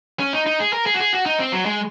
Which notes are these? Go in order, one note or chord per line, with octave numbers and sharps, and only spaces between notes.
C#4
D#4
D#4
G#4
A#4
G#4
F#4
G#4
F#4
D#4
C4
F#3
G#3